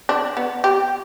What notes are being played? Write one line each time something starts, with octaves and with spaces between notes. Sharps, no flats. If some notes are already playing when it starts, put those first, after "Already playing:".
D4
B3
G4